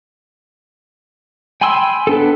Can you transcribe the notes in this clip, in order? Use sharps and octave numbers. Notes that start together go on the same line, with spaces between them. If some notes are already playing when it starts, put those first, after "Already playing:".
G5 G#5 B5 C6 E6
B3 D4 A4